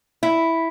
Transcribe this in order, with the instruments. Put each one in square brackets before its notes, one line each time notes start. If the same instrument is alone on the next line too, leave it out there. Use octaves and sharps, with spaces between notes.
[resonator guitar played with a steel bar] E4